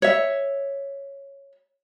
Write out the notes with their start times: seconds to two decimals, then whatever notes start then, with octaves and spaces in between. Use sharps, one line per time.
0.02 C#5 E5